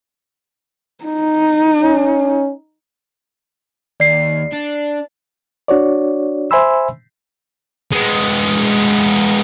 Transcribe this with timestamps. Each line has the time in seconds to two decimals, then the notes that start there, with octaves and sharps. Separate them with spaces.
1.05 D#4
1.82 C#4
4.00 D#2 D5 C7
4.53 D4
5.68 D4 F#4 C#5 D5
6.51 C5 E5 G#5 B5 C6 E6
7.92 G#3 B3